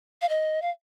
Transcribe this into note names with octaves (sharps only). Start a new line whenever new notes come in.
F5
D#5
F5